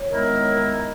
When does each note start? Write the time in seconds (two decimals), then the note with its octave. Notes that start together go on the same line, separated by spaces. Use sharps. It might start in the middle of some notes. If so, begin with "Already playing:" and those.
Already playing: C#5
0.10 D#3 G#3 B3 E4 A#4